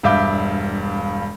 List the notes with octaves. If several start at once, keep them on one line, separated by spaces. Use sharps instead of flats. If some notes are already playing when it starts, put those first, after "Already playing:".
E1 G2 E5 F5 D6 G6